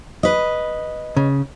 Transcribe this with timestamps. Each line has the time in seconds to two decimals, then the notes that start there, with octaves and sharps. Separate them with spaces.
0.23 B4 D#5
1.17 C#3